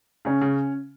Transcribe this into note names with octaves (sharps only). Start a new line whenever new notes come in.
C#3 C#4
C#3